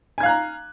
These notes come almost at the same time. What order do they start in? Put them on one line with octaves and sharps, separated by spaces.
G#5 G#6 F5 F#6 A#5